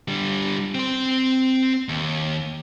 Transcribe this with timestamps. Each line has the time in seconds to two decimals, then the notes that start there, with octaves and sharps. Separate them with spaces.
0.08 D3 G3
0.75 C4 C5
1.89 D#2